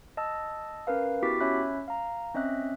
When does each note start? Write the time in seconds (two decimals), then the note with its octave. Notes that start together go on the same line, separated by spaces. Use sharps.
0.17 D#5 A5 E6
0.87 C#4 A#4 B4 F5
1.22 B3 E4 F#4 G4 D6 B6
1.40 C#4 C#5 E5 B5 F#6
1.88 F5 A#5
2.34 C4 C#4 D#5 E5 F#6